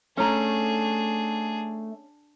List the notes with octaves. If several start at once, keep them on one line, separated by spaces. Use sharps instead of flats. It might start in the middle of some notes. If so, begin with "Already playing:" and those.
A3 C#4 D4 G#4 A#5